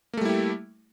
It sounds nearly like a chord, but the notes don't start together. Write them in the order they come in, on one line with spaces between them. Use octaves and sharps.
A#3 A3 G3 E4 G4